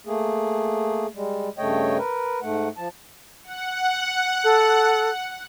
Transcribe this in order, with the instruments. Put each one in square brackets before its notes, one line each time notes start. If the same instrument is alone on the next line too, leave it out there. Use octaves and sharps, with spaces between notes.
[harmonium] A3 A#3 G#4
G3 G#3
G2 C#3 A3 C#5 D#5 G5
A#4 B4
G#2 A3 F#5
F3 A5
[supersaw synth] F#5
[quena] A4